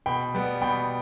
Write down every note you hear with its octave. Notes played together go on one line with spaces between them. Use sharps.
B2 G5 B5
G3 B3
B2 G5 B5